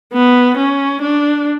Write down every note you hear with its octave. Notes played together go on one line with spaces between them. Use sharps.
B3
C#4
D4